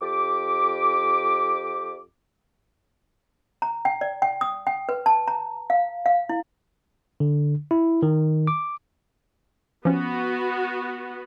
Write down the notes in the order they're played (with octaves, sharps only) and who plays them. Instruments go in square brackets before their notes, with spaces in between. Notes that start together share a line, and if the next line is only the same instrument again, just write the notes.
[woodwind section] F2 G4 D6
[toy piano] A#5
G5
D5
G5
D#6
G5
B4
A5
A#5
F5
F5
E4
[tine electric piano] D3
E4
D#3
D6
[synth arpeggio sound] F3 C#4 [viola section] B3 F#4